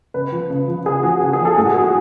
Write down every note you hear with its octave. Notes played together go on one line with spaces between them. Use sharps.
C#3 B4
F3
C#3
F3
C#3 G#4
F3 F#4
C#3 F#4
G#4
F3
A4
A2 G#4
F#4
F#3 G#4
F#4